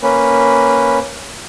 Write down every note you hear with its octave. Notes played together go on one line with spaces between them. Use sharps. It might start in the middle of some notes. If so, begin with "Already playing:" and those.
A#3 C#4 B4